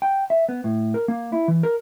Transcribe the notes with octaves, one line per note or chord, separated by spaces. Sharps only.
G5
E5
B3
A2
A#4
A#3
E4
E3
A#4